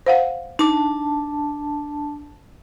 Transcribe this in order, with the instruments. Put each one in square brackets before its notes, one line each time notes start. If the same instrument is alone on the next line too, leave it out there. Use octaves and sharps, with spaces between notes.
[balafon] C5 F5 F#5
[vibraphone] D4 A5 [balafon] D#4 D6